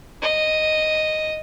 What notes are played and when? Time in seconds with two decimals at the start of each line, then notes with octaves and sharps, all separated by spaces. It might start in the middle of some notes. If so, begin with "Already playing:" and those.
0.22 D#5